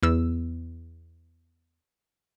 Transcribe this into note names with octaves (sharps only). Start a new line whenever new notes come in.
E2 E6